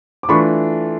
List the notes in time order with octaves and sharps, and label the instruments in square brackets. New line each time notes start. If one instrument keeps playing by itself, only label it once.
[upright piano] D6
[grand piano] E3 A3 D4 F4 [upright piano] B5 C#6